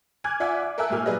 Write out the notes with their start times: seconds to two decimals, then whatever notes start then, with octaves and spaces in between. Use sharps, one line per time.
0.24 G#5 D6 F6 F#6 G#6
0.40 F4 D5 E5 F#5 G#5 D6
0.62 D6
0.78 A4 A#4 E5 G#5 E6 F#6
0.90 G#1 A#2 G4 G#5 F6
1.06 F#3 G#4 B4 D5 D#5